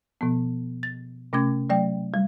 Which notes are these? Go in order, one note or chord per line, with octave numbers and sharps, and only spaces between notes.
B2 F3 B3
A6
C3 A3 C#4 D6 G#6
F#3 A3 D5 G5
G3